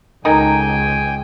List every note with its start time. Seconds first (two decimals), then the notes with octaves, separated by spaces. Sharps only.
0.25 C#2 D#4 A4 A#4 G5 G#5